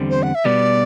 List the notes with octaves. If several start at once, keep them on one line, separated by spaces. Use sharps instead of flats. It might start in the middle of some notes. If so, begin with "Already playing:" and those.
Already playing: E2 D3 G3 C4
C5
F#5
E5
B2 G3 B3 D5